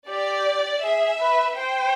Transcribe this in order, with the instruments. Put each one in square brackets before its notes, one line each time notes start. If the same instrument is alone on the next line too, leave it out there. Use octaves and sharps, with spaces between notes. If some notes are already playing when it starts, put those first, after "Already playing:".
[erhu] G4 [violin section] D5
[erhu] G#4 [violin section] E5
[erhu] B4
[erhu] C5 [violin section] G5